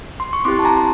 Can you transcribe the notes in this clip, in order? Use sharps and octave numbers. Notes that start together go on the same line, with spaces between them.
C6
C#6
C4 E4 G4 C6 D6
A5
G#5 A#5
C6